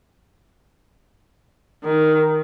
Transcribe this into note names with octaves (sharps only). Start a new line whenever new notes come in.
D#3